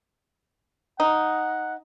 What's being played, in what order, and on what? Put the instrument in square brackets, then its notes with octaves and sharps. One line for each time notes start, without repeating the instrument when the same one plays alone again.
[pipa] D#4 [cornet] F#5